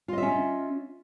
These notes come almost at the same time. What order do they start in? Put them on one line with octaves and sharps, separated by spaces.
F4 D#5 E5 C#4